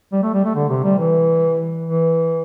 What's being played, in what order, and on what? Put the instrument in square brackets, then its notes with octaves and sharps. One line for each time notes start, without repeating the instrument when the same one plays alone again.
[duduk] G3
A3
G3
A3
D3
C3
G3
E3
E3